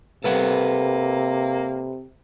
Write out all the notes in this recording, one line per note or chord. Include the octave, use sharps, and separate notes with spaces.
C3 A#3 A4 B4 F#5